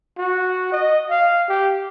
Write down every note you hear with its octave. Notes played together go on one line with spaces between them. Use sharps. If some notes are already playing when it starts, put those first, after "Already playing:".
F#4
D#5
F5
G4